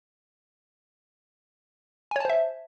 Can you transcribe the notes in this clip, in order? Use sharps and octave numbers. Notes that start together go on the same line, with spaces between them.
C5 C#5 E5 G#5 A5